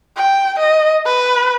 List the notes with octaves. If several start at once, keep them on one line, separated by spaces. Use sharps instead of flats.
G5
D#5
B4